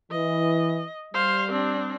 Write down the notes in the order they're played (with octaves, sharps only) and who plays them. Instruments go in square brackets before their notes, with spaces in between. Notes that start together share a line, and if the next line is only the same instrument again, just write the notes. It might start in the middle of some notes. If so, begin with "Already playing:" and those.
[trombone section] E3 [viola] D#5
[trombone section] G3 [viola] C5 F5
[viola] C4 D4